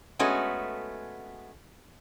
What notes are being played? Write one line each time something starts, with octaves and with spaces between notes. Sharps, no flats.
G#3 A3 B3 C#4 F#4